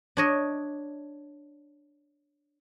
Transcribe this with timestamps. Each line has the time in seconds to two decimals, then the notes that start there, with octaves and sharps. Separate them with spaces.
0.17 D4 C#5 D#5